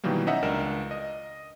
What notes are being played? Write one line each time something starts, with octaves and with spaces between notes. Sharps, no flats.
B2 D#3 E3 F#3 G3 A#3
C#4 D#4 D#5 E5 F#5
C#2 D4 A#4 E7
D#5